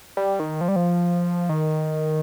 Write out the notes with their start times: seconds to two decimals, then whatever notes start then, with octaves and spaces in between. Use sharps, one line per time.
0.17 G3
0.39 D#3
0.61 F3
0.68 G3
0.76 F3
1.49 D#3